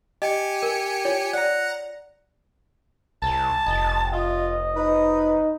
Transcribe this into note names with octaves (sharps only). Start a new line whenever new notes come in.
G4 D#5 G#5 C#7
A#4
F4 C#5
D5 F#5 A#5
C2 A5
F1 D#5
F4 D#5
D#4 B4